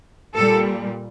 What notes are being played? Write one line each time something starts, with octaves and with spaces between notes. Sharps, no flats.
A#2 G3 A4